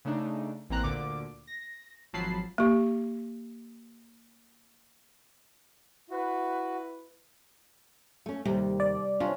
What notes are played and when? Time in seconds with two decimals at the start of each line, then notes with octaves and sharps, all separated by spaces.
0.05 C#3 A3 D4 D#4
0.69 A1 E3 A#3 C4 A#5 F#6
0.83 D2 A#2 D3 D6
1.47 A#6
2.13 G#1 F3 F#3 A5 B5 C7
2.58 A#3 G4
6.10 E4 F#4 B4
8.26 A3 C#4
8.45 D#2 C3 G3
8.80 D5
9.20 C3 C#4 D4 F4